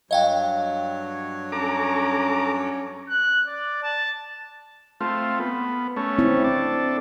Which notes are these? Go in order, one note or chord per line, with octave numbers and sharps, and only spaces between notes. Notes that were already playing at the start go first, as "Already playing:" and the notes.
G2 F#3 C#5 D#5 F5 G5
C#4 A4 A#5 D6
F#6
D5
A5
A3 C4 F4
B3
A3 C#4
C4 E4
D4 A4